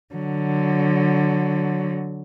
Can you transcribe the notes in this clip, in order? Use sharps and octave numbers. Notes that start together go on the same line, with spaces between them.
D3 F#3